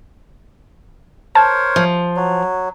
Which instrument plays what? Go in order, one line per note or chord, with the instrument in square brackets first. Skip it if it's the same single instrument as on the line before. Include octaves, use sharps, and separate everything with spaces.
[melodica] A#4 C5 C#5 [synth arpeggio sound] A5
[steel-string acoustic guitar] F3
[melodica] F#3